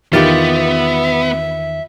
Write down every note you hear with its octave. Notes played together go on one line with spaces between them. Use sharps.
E2 D#3 B3 F4 G4 E5 A6